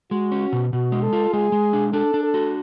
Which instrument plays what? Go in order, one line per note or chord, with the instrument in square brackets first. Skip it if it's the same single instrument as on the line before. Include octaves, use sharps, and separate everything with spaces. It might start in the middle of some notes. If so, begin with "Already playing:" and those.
[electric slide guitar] G#3 [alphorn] F#4
[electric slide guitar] C#4
B2
[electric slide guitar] B2 [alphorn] F#4
[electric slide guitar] G#3
[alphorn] A4
[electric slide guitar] F4
[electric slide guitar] G#3 [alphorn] G#4
[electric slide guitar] G#3
D4
[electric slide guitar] D4 [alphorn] A4
[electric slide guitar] D4
[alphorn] A4
[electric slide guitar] F#4